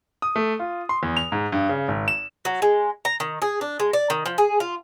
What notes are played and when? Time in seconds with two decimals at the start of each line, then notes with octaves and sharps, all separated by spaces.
0.22 D#6
0.36 A3
0.59 F4
0.89 C6
1.03 E2
1.17 F7
1.32 G#2
1.52 G2
1.69 C#3
1.88 G#1
2.08 E7
2.45 F#3
2.62 G#3
3.05 A#5
3.20 D#3
3.42 G#4
3.61 D4
3.80 G#3
3.93 D5
4.10 D#3
4.26 F3
4.38 G#4
4.60 F4